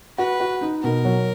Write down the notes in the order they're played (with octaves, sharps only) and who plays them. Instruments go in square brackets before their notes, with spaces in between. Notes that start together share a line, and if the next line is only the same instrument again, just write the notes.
[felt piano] F#4 [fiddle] B4
[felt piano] F#4
D#4
[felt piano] B2 [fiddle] A#4
[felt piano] F#3